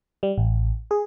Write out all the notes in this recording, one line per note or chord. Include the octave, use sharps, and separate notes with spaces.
G3
A1
G#4